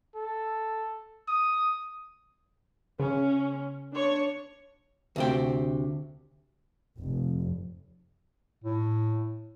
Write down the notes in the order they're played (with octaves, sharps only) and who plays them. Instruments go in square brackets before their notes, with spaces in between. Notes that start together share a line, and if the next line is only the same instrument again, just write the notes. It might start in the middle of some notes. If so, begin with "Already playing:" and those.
[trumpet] A4
D#6
[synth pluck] C#3 [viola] C#4
[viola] D4 C#5
[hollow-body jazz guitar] D2 C3 G5
[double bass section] F1
[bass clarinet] A2